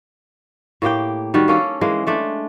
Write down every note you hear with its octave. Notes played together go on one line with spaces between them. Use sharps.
A2 A#3 G4 G5
D#3 G3 F#4
A#3 C#4 A4 F5
E3 G#3 A#3
G#3 A3 D4